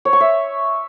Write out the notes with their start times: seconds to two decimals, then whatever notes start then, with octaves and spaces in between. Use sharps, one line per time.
0.05 C#5
0.13 C#6
0.20 E5